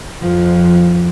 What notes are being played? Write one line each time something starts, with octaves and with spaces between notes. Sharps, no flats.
F2 F3